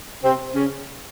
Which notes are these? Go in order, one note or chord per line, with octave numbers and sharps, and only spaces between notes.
C3 C4
C#3 C#4